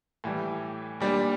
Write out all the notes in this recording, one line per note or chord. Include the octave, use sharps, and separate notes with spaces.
A2 E3 G3
A#2 G3 D4